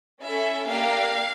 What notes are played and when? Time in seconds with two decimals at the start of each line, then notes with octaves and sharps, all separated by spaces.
0.23 C#4 E4 A4 E5
0.68 A#3 D4 G4 F5